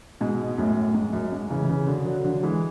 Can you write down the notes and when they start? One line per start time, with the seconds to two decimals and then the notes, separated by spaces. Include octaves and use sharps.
0.20 G#2 B2
0.58 F#2 A2
0.94 G#2
1.13 F#2
1.32 G#2
1.50 C#3 E3
1.69 C#3 E3
1.87 D3 F#3
2.05 D3 F#3
2.24 D3 F#3
2.43 E3 G#3